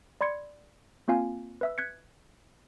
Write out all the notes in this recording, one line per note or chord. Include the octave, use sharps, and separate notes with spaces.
D5 B5 C6 G#6 C#7
A#3 C4 F4 F5 G#5
B4 E5 E6
F#6 G#6 B6 C#7